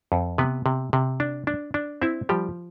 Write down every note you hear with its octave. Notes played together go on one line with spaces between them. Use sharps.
F2
C3 B3 B4
C3
C3
D4
D4
D4
C4 E4 E5
F3 G3 G4